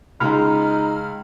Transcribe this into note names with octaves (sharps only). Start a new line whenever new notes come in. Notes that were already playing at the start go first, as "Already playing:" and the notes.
C#2 G#3 D#4 B5 C6 F6